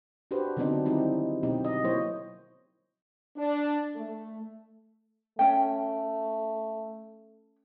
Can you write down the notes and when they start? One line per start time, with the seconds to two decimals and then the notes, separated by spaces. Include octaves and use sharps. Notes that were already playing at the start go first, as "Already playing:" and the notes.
0.31 D4 F#4 G4 B4 C5
0.57 D3 F#3 B3 C4 D4 D#4
0.85 D#3 G3 C4 D#4 E4
1.43 B2 F#3 C4 D#4 G4
1.65 D#5
1.84 F#3 A#3 E4 C5 C#5 D#5
3.37 D4
3.94 A3
5.39 A3 C#4 G5